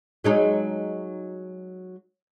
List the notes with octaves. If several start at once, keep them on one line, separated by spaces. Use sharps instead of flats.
F#3 G#3 D#4